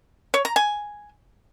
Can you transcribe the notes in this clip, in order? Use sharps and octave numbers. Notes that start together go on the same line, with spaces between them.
C#5
A#5
G#5